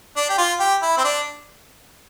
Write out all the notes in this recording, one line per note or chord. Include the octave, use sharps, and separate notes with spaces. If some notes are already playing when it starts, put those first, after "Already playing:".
D4
G4
F4
G4
E4
C4
D4